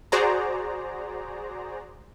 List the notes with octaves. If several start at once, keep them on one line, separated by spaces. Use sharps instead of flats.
F#4 G#4 C5 D5 A#5